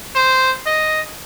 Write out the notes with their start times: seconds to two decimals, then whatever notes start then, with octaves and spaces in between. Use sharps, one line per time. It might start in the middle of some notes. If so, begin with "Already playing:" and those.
0.15 C5
0.66 D#5